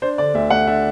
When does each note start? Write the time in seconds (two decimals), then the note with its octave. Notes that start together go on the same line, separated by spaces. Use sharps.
0.02 D4 C5
0.18 D3 D5
0.34 D2 E5
0.50 A3 F#5
0.67 D4 E5